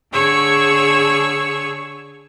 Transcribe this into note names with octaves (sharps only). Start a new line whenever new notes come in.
D3 G#4 C#5 C#6 E6